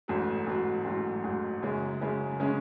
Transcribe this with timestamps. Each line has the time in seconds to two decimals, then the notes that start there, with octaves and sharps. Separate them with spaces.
0.08 A1 G#2 F#3
0.47 A1 G#2 F#3
0.85 A1 G#2 F#3
1.24 A1 G#2 F#3
1.62 F#2 C#3 G#3 C#4
2.01 F#2 C#3 G#3 C#4
2.40 C#3 G#3 C#4